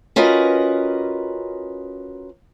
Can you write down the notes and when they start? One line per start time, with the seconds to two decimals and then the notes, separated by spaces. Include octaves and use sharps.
0.16 C#4 F4 F#4 A#4 B4 D#5